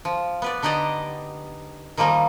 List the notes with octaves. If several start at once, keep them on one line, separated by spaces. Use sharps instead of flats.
F3
B3 B4 D5
D3 D#4 G4 D5 D#5
D#3 F3 G3 A#3 D#4